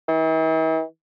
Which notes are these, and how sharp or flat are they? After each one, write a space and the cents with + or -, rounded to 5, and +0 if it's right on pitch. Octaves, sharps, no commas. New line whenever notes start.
E3 -45